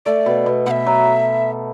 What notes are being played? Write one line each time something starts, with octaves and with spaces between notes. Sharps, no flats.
A3 D5
B2
B2
B2 E5 F#5
F#3